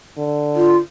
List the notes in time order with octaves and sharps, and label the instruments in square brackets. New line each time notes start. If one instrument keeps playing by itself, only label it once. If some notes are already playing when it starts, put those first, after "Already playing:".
[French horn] D3
[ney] F4